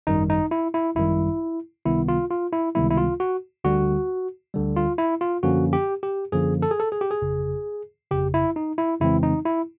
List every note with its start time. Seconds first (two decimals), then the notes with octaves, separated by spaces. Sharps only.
0.07 G#1 F#2 D#3 G3 D#4
0.30 D#4
0.51 E4
0.74 E4
0.96 G#1 F#2 D#3 G3 E4
1.85 C#2 C3 D#3 G3 B3 E4
2.08 F4
2.30 F4
2.53 E4
2.75 C#2 C3 D#3 G3 B3 E4
2.91 E4
2.97 F4
3.20 F#4
3.64 D2 D3 G3 F#4
4.54 D2 D3 G3
4.76 F4
4.98 E4
5.21 F4
5.43 F#2 D3 F3 A#3 C#4 F#4
5.73 G4
6.03 G4
6.32 F#2 D3 F3 A#3 C#4 G#4
6.62 A4
6.71 G#4
6.80 A4
6.92 G#4
7.01 G4
7.11 G#4
7.22 G1 F2 C#3
8.11 G1 F2 C#3 G4
8.34 E4
8.56 D#4
8.78 E4
9.00 F2 C#3 E3 G#3 C4 E4
9.23 D#4
9.45 E4